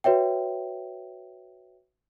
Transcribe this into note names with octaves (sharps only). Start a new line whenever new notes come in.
F#4 B4 C#5 E5 G5